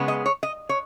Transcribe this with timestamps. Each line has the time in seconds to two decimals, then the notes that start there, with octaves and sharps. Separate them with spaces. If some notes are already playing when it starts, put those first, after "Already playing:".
Already playing: C#3 G#3 B3
0.08 D#5
0.26 C#5
0.43 D#5
0.69 C#5